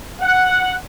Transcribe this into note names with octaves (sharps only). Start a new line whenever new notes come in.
F#5